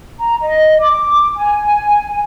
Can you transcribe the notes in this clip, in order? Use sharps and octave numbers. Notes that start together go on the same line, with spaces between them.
A#5
D#5
D6
G#5